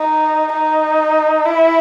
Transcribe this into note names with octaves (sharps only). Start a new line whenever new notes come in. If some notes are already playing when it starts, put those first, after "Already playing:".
Already playing: D#4
D#4
E4